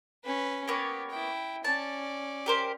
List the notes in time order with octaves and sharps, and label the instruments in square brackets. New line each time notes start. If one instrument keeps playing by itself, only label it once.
[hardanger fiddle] C#4 B4
[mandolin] A#3 B3 C#5 [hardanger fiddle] G4
[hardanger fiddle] E4 G5
[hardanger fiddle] C#4 D5 [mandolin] A5
[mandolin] G4 A#4 C5